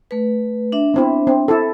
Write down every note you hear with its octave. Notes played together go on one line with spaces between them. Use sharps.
A3 B4
D4 E5
B3 C4 E4
C4
E4 A4